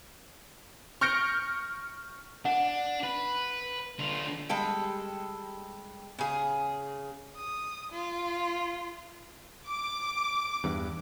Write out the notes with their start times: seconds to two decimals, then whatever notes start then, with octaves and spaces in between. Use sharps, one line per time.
1.01 C#6 F6 G6 A#6 C#7 D7
2.45 D4 F#5
3.03 B4
3.99 D3 F4
4.49 G3 G#3 A4 G5
6.19 C#3 G#4
7.36 D#6
7.92 F4
9.67 D6
10.64 E2 G2